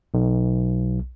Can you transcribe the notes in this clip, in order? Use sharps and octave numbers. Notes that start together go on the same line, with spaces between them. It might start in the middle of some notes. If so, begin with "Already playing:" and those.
B1